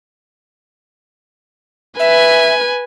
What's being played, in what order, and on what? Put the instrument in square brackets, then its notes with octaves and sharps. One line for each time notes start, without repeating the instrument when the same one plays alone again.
[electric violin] B4 G#5 [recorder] E5